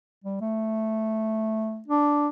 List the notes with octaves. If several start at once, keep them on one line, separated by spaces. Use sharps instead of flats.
G3
A3
D4